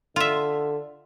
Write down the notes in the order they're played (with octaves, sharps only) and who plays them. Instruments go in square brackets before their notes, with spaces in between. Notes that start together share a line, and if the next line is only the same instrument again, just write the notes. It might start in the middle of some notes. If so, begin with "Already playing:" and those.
[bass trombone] D3 [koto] F4 E5